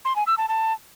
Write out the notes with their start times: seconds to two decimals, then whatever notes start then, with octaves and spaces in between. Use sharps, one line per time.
0.05 C6
0.16 G#5
0.27 E6
0.38 A5
0.49 A5